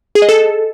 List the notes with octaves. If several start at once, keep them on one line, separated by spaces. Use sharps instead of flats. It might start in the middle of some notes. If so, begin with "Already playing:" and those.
G#4
D#5
A4